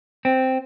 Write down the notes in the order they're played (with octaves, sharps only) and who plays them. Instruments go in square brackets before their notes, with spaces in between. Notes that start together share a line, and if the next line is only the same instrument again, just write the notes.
[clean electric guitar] C4